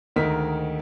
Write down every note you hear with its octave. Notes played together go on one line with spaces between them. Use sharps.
D2 G#2 D#3 A#4 B6